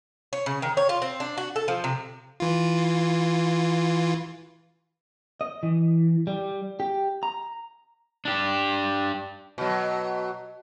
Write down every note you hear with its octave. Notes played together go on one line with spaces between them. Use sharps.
C#5
C#3
D#3
C#5
F4
C4
D4
F#4
A4
F3
C3
E3 F4
D#5
E3
G3
G4
A#5
D4 G4
B2 F#3